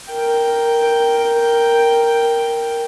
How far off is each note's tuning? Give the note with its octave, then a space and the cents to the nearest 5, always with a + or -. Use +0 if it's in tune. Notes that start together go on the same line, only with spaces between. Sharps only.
A#4 +0 G5 +0